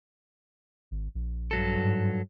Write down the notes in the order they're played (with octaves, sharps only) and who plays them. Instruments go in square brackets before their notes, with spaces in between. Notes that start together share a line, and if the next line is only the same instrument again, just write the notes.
[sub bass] G#1
A#1
[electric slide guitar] G2 F#3 A4
[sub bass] G#2